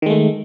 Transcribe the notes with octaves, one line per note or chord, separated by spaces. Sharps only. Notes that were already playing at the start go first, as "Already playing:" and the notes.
D#3 G#3 A3